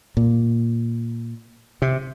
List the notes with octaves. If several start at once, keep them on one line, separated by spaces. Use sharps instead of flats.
A#2
C3